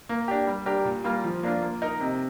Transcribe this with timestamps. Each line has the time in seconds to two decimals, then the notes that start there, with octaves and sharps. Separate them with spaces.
0.09 A#3
0.28 D4 G4
0.47 G3
0.66 D4 G4 A#4
0.85 A#2
1.04 G3 A#3 F4 A#4
1.24 F3
1.43 A#3 D4 F4
1.62 A#3
1.82 D#4 A#4
2.00 C3